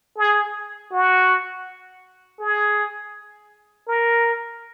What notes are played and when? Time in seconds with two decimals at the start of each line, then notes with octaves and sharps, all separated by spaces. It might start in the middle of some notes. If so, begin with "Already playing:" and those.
0.18 G#4
0.92 F#4
2.39 G#4
3.88 A#4